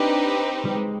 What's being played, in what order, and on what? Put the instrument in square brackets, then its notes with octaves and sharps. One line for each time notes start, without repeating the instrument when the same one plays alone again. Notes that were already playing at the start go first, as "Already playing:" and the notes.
Already playing: [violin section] C4 D#4 G4 B4 [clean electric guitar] D4
[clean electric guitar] G3
G#3